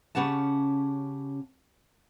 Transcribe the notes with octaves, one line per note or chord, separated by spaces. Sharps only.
C#3 F3 C#4 G4 F#5 A5